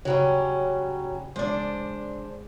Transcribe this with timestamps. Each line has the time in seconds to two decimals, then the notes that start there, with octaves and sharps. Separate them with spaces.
0.05 C#3 F#3 G3 C#4
1.36 G#3 D4 C5 D5